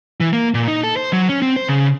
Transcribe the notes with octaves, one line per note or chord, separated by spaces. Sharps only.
E3
A#3
A#2
D#4
A4
C5
F#3
C#4
C4
C5
C#3